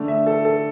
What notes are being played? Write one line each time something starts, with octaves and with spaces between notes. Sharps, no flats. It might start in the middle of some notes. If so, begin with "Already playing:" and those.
Already playing: D3 A3 D4
E5
A4
A4